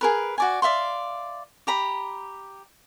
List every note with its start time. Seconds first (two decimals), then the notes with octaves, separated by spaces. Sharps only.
0.01 G#4 A#4 B4
0.38 F#4 D5 G#5
0.62 D5 E5 F5 C6
1.67 G4 A#5 B5